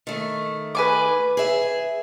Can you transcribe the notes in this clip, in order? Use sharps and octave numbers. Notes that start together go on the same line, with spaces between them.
D#3 A3
B4 G#5 D6
G#4 E5